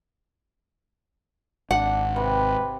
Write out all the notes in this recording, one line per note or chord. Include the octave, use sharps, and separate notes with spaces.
G#1 D4 F#5
C3 B4